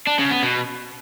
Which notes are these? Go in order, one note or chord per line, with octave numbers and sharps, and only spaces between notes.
D4
C#3
B3
B2